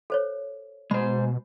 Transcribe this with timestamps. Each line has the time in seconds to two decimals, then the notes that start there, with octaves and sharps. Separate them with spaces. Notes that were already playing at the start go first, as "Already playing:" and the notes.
0.10 A4 C5 C#5
0.91 B2 G#3 C5 B5